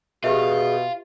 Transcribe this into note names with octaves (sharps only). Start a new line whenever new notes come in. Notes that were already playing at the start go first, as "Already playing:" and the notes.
B2 F4 G4 G#4 B4 E5